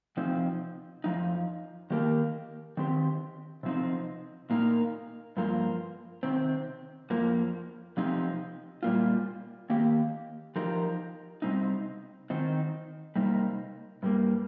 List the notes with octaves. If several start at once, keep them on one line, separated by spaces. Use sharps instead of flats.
C3 F3 C4 D#4
F2 F3 D#4
D#3 A#3 G4 A#4
D#3 C4 G4
C3 F3 C4 D#4
A#2 A#3 D#4 A#4
G2 F3 A#3 F4 A#4
C3 D#3 C4
F2 F3 A#3
C3 F3 C4 D#4 G4
A#2 G3 A#3 F4
D#3 A#3 G4
F3 D#4 G4 A#4
C3 G3 C4 D#4
D#3 C4 D#4
C3 G3 A#3 D#4
G2 G3 A#3